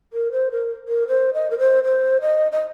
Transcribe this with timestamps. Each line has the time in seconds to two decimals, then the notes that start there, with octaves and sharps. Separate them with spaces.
0.13 A#4
0.31 C5
0.51 A#4
0.88 A#4
1.07 C5
1.33 D#5
1.50 A#4
1.59 C5
1.84 C5
2.21 D#5
2.52 D#5